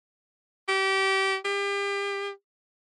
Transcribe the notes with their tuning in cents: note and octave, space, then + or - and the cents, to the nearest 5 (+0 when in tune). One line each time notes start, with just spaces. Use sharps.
G4 -25
G4 +35